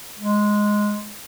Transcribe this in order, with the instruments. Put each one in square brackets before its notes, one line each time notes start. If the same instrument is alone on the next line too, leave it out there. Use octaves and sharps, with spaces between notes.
[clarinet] G#3